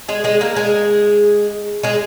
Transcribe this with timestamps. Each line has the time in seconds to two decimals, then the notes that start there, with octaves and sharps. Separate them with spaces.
0.08 G#3 G#4
0.24 G#3 G#4
0.41 A#3 A#4
0.56 G#3 G#4
1.83 G#3 G#4